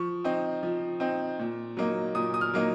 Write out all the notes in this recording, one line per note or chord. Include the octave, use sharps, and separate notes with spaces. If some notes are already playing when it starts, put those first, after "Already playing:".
Already playing: F3 C#6
C4 D#4
F3
C4 D#4
A#2
F#3 A#3 D#4
A#2 D#6
D#6
F6
F#3 A#3 D#4